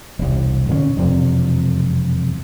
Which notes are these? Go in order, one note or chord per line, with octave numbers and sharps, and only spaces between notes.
E1 C2
A#2 D3 B3 C#4
E1 F2 C3